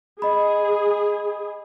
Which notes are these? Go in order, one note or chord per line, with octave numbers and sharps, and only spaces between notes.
G#4 D#5 B5